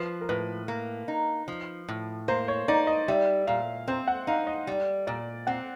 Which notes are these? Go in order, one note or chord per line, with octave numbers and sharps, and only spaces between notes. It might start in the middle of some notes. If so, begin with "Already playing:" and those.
Already playing: F3 B4
A#4
A2 B4
A#3
D#4
F3
A2
A#3 C5
C#5
D#4 D5
D#5
G3 E5
A#2 F5
C4 C5
F#5
D#4 F5
D#5
G3
A#2 D5
C4 F#5